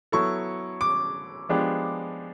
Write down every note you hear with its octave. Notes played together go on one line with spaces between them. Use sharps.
F#3 B3 E4 A4 C#6
D6
F3 G#3 B3 D4 G4